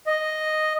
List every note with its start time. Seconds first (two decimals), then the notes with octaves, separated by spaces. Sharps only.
0.07 D#5